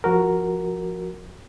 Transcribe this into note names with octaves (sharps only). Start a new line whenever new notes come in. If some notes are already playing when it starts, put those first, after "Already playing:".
F3 F#4 A#4